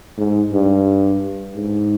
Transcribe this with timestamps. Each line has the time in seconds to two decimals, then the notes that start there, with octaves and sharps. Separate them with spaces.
0.18 G#2
0.52 G2
1.55 G#2